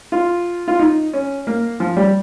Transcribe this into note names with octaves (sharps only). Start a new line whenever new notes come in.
F4
F4
D#4
C#4
A#3
F3
G3